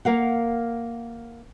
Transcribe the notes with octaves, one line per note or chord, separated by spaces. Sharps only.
A#3 A#4 F5 F#5